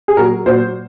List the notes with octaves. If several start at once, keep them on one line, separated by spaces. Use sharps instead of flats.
G#4
A#2 F#3 A#4
A#2 F#3 C5